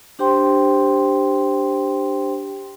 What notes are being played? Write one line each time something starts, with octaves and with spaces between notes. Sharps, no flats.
D4 G4 C5 G5 C6